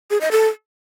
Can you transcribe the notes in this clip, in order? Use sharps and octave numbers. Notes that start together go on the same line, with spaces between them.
G#4
D#5
A4